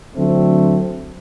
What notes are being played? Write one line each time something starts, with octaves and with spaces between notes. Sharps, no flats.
D3 F#3 A3 C4